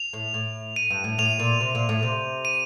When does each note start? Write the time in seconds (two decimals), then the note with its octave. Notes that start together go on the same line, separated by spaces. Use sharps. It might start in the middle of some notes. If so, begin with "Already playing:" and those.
Already playing: F7
0.13 A2
0.34 A2
0.76 D#7
0.90 G2
1.04 A2
1.18 A2 F7
1.39 A#2
1.61 C3
1.75 A#2
1.89 A2
2.03 C3
2.45 D#7